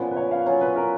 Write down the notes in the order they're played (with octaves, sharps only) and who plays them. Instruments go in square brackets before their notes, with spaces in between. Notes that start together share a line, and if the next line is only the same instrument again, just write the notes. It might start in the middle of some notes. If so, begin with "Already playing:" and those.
Already playing: [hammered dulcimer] A#2 F3 B3 C#4
[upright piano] B4
C#5
F5
[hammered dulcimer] F#3 C#4 F4 [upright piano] C#5
[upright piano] B4
A#4